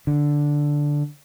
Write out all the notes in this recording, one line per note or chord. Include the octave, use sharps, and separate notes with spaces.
D3